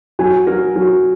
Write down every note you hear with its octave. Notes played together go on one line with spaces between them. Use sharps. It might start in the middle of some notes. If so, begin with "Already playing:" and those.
F#3 G#5
F#3 A#4
F#3